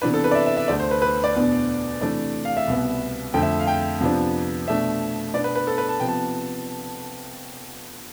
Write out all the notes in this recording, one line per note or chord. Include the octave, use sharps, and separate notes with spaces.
C3 E3 B3 D4 B4
A4
B4
D5
E5
E5
E5
D2 D3 A3 D5
C5
B4
B4
D5
E2 B2 B3 D4
C3 E3 A3 D4 D5
F5
E5
C2 B2 B3
F2 D3 A3 G5
E5
F5
G5
F2 C3 F3 B3 D4
B2 A3 D4 E5
B2 B3 D4 D5
B4
B4
A4
B4
A5
C3 F3 B3 G5
A5